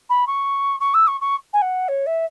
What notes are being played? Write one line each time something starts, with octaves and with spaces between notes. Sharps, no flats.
B5
C#6
C#6
E6
C#6
C#6
G#5
F#5
C#5
E5